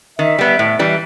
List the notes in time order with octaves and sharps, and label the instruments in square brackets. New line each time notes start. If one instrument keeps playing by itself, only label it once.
[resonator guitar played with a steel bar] D#3 [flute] E5
[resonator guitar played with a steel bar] G3 B3
A2
E3 G3